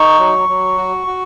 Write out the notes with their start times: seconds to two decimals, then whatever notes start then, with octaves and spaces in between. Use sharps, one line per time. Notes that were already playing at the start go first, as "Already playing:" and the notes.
Already playing: D#4 C#6
0.19 F#3
0.49 F#3
0.77 F#4
1.07 F#4